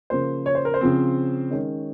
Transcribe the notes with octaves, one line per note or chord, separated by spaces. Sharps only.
C#3 F3 A#3 C5
C#5
C5
A#4
C5
C#3 F3 C4
D#3 G#3 C#4 C#5